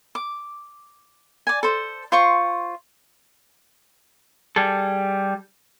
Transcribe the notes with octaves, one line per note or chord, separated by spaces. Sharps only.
D6
D5 G#5
A4 C5
F4 C5 C#6
G3 G#4 A4